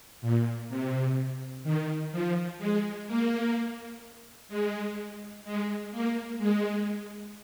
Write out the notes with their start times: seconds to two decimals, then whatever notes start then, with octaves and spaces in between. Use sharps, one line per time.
0.21 A#2
0.69 C3
1.64 D#3
2.12 F3
2.58 G#3
3.07 A#3
4.48 G#3
5.44 G#3
5.92 A#3
6.39 G#3